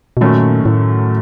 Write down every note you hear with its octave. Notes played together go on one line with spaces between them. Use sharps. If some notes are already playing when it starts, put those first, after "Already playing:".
B2
F#2 A#2 D#3 F#3 A3 C#4
A2